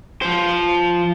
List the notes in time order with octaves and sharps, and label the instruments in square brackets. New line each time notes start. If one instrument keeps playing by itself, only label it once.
[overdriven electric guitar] F3 C5